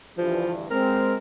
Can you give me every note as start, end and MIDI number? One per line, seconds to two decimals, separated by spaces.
0.18 0.67 38
0.18 0.67 43
0.18 0.67 52
0.18 0.52 53
0.71 1.15 56
0.71 1.15 60
0.71 1.15 70